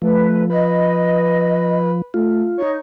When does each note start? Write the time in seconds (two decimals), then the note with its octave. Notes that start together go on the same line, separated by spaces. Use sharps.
0.02 F3 A3 B4
0.50 B4 D#5
2.14 A3 F4
2.58 D#4 C#5